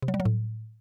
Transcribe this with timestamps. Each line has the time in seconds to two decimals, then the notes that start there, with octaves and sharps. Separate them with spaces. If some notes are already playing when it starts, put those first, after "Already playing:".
0.02 C3
0.08 F#3
0.14 G3
0.20 F#3
0.25 A2